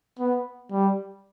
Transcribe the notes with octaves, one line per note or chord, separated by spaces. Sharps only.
B3
G3